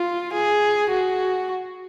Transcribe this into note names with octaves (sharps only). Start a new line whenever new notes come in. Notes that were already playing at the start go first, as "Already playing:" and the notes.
Already playing: F4
G#4
F#4